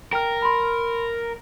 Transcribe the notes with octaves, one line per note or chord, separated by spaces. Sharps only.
A#4 G5 F6
B5 C6